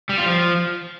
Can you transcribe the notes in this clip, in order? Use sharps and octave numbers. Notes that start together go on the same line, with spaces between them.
G3
F4
F3